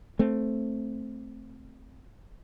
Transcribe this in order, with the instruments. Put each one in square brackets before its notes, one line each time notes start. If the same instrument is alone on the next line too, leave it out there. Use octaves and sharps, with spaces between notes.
[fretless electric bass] A3 C4